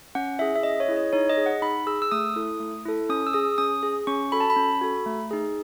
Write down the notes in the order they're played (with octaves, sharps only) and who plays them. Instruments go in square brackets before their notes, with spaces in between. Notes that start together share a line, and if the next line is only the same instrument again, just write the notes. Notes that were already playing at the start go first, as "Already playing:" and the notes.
[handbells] C#4 F#5
E4 G#4 E5
E5
C#4 D#5
C#5
E4 G#4
D#5
D#4 C#5
D#5
G#4
F#5
D#4 B5
G#4 E6
E6
A3 D#6
E4 A4
A3
E4 A4
C#4 D#6
E6
G#4 D#6
C#4 D#6
G#4
C#4 C#6
F#4 A4 B5
A5
B5
C#4
F#4 A4
A3
D#4 G#4